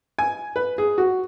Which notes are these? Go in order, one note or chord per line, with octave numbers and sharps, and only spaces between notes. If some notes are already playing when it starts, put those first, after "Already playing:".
G#5
B4
G#4
F#4